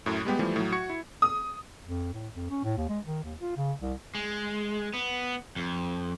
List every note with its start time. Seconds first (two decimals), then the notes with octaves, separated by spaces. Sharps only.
0.06 F#2 A2
0.25 G3 G#3 B3 G4
0.39 E3 F3 G3 A3
0.56 A2 F#3
0.72 F#4 C#6 G#6 C#7
0.90 E4
1.22 D#6
1.87 F2
2.14 A2
2.36 F2
2.50 C#4
2.64 A2
2.77 D#2
2.89 G#3
3.06 D#3
3.24 D#2
3.40 F4
3.57 C#3
3.82 C2
4.15 G#3
4.94 B3
5.56 F2